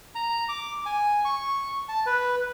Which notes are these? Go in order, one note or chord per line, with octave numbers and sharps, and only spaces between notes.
A#5
D6
G#5
C#6
A5
B4